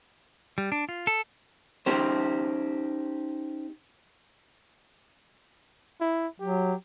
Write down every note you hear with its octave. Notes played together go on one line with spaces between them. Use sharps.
G3
D4
F4
A4
C#4 D#4 G4 C5
E4
F#3 G4